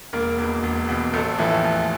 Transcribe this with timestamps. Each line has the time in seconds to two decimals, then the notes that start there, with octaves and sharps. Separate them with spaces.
0.13 E1 A#3 A#4
0.38 E2 B2
0.63 E1
0.89 E2 B2
1.13 A1 A3 A4
1.39 A2 E3 F3 E4
1.64 A1